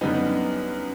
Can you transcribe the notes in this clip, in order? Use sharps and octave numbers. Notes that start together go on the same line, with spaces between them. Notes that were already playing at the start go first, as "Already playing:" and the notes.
F#2 D3 G3 B3 D#4